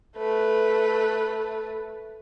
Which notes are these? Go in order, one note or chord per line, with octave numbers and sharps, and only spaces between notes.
A3 B4